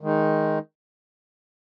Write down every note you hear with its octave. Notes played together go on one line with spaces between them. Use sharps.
D#3 G#3 D#4